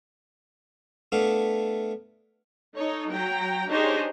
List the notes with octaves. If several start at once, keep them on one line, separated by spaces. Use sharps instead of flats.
A3 B3 D4 E4 F5
D#4 A4 C#5
F#3 G5 A#5
D4 D#4 G4 G#4 C5 C#5